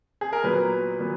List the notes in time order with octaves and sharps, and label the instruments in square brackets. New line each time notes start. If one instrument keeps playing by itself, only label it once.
[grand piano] G#4
A#4
A#2 F#3 B3 B4
A#2 F#3 B3